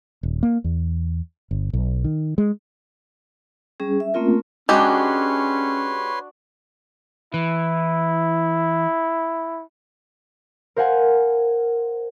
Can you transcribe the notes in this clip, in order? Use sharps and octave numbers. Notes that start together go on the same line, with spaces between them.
D#1
A#3
E2
G1
B1
D#3
G#3
G3 C#4 G#4
E5
A3 A#3 C4 C#4 F4 A#4
G#3 C#4 D4 F#4 G4 B4 C#5 C6
E3 E4
A#4 C5 F5 F#5 G#5